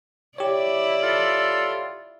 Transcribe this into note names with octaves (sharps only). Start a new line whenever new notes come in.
E4 G4 C#5 D5
F4 A4